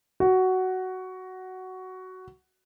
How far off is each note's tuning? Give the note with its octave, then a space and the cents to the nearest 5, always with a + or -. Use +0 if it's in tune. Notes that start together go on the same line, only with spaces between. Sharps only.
F#4 +10